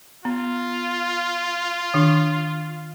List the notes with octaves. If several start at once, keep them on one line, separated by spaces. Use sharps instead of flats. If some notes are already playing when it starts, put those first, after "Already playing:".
B3 F4
D#3 D4